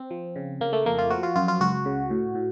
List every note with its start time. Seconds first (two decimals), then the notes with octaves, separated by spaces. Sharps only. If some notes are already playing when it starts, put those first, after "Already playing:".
Already playing: C4
0.10 F3
0.36 C#3
0.61 C#3 A#3
0.73 A3
0.86 F2 A#3
0.98 F4
1.10 F3 F#4
1.23 F4
1.35 F#2 F4
1.48 F4
1.60 C#2 F#4
1.86 C#3
2.10 A2
2.35 A2